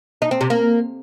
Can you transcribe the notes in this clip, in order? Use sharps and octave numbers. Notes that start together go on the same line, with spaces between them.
D#4
C4
C3
A#3